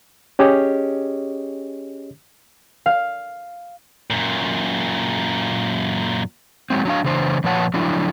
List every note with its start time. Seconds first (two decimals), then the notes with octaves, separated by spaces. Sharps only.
0.39 C#4 G4 G#4 C#5 D#5
2.86 F5
4.10 F#2 A#2
6.70 F#3 G#3 C4
6.85 F#3 D4 F5
7.04 C#3 E3 D4 C5
7.44 A#2 F3 B4 C#5 F#5 A5
7.74 F3 F#3 D4 E4